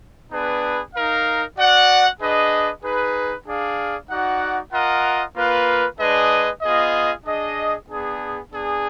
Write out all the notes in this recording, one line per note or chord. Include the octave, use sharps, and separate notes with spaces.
B3 D4 G#4 B4
D#4 A#4 F5
F#4 D5 F#5
D4 G#4 B4 D#5
D#4 G#4 B4
D4 G#4 D5 F5
D#4 F#4 D5 F#5
F4 A#4 D#5 F#5
A#3 F4 B4
G#3 D4 G#4 B4 D#5
B3 F4 G#4 D#5
D4 G#4 D#5
B3 D4 G#4
B3 D4 G#4